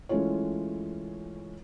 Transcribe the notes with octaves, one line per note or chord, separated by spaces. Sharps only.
E3 G#3 A3 C#4 F4 C#5